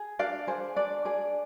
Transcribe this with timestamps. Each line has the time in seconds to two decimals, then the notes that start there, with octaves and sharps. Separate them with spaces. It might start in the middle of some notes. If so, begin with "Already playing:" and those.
Already playing: G#4
0.19 D4 D5 F5
0.47 G#4 C5
0.76 D4 D5
1.05 G#4 D5